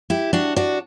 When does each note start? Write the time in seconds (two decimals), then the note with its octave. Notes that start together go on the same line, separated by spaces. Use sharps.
0.10 E4 G4
0.33 D4 F#4
0.56 D4 F#4